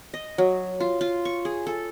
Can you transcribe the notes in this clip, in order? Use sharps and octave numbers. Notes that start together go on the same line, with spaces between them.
D#5
F#3
F4
F4
C#6
G#4
A4